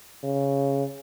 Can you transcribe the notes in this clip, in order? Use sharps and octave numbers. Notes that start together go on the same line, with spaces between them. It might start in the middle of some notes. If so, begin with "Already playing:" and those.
C#3